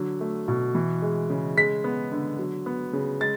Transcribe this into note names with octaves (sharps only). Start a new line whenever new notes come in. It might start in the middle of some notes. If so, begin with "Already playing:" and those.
Already playing: D3 F#3
A3
B2
E3
G#3
C#3
G#3 B6
B3
D3
F#3
B3
C#3
G#3 A6